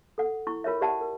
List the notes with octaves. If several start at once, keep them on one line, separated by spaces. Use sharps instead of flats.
A4 F#5
E4 C#6
F4 A#4 C#5 E5
G4 C5 D5 E5 F#5 A5
A#4